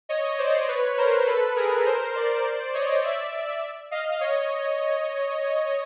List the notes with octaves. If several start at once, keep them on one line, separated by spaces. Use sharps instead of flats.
C#5 D#5
C5 D5
B4 C#5
A#4 C5
A4 B4
G#4 A#4
A#4 C5
C5 D5
C#5 D#5
D5 E5
D#5 F5
C#5 D#5